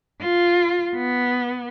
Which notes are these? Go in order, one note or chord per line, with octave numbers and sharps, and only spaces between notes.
F4
B3